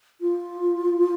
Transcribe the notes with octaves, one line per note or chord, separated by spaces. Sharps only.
F4